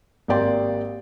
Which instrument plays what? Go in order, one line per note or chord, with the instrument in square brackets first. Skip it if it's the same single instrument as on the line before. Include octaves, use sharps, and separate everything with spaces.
[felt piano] G#1 A#3 G4 D5 G5 C6